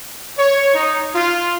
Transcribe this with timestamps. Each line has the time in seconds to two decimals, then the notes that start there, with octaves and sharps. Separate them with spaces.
0.38 C#5
0.74 D#4
1.15 F4